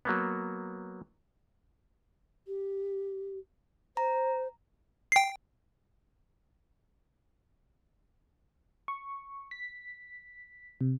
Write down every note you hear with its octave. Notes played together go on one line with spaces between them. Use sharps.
F#3 A#3 B3
G4
C5 A#5
G5 C7
C#6
B6
C3